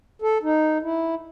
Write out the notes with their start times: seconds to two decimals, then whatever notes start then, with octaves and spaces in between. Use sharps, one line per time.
0.22 A4
0.43 D#4
0.82 E4